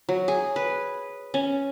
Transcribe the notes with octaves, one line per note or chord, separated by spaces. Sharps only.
F#3
G#4
B4
C#4